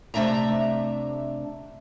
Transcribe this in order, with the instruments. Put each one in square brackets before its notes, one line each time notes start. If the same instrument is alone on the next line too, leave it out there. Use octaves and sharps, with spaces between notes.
[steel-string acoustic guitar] C3 A3 D4 E5 A#5